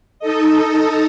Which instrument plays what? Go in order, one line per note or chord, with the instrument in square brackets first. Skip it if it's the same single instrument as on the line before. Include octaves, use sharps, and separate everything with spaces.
[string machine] D#4 A4 D#5